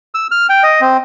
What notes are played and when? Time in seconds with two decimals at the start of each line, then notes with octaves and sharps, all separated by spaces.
0.15 E6
0.31 F6
0.49 G5
0.63 D#5
0.81 C4